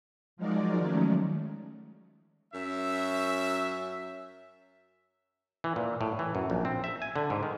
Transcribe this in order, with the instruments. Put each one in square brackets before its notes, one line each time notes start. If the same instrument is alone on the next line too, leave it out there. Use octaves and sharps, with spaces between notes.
[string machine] F3 F#3 G#3 D#4 A#4 D5
D#3 F#3 G#3 A3 C#4
[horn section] F#2 C#4 E5
[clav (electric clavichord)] E3
A#2
A2
E3
F#2
A#1
C4
E5
G#5
D3
G#2
D#3